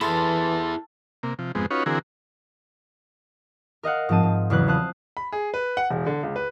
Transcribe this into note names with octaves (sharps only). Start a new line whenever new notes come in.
E3 E4 G#4 A4 E5 B5 C6 A6
C3 A#3
C3 F3
F2 G#2 G#3 B3 C4
C#4 D#4 F4 F#4 B4 C#5
D3 E3 C4 F#4 G#4 A#4
A#4 D#5 F5 F#5
G#2 F3 C4 D#5 A5 D#7
G#2
E2 C#3 F#3 B4 F#6
C5 F5 A5 D#6 F#6
B5
G#4
B4
F#5
E1
D3
C#2
B4